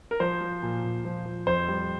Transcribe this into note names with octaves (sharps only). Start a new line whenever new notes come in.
A#4
F3 C5
F3
A#2
A#2
F3
F3
F2 C5
G3